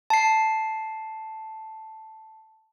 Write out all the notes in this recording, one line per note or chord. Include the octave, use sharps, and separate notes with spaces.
A5 C7